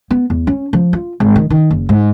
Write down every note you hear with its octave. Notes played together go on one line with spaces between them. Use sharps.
B3
E2
C#4
F3
F4
G#1
D#3
D#3
F#1
G#2